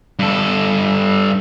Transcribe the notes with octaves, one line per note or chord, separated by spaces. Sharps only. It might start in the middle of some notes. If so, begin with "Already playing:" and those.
G2 A4